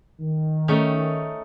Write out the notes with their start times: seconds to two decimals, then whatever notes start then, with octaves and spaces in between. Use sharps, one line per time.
0.20 D#3
0.68 A3 C#4 D#4